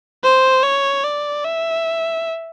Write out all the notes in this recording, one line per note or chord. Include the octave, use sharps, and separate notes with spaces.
C5
C#5
D5
E5